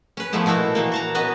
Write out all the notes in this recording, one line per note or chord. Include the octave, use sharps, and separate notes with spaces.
C#4 B4
A#2 F3 A3 B3 E4
B2 A3 B3 E4 F#4
A#2 E3 A#3
F#4 A5 A#5
B3 C#4 F#4 B4 D#5